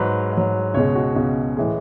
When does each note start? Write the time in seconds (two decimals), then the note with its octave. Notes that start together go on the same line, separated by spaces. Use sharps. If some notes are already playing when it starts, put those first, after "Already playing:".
Already playing: G#2 F#3 B4
0.32 G#2 F#3
0.74 C#2 B2 G#3 C#5
0.95 F#4
1.16 C#2 B2 G#3
1.57 A2 E3 G#3